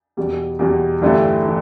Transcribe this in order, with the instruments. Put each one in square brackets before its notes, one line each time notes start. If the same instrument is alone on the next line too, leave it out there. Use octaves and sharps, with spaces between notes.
[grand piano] E2 B2 G3
E2 B2 G3
G1 G2 E3 A3 G4
E3